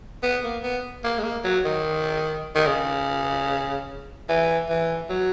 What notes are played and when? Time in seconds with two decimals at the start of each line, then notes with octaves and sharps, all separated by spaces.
0.23 B3
0.43 A#3
0.63 B3
1.04 A#3
1.18 G#3
1.24 A#3
1.44 F#3
1.65 D#3
2.55 D#3
2.66 C#3
4.29 E3
4.69 E3
5.09 F#3